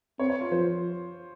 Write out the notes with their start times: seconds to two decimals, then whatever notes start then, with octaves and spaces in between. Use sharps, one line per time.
0.19 C4 C#5
0.30 C#5
0.41 F4
0.51 F3 C5